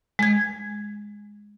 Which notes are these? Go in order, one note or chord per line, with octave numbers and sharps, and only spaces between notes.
G#3 G#6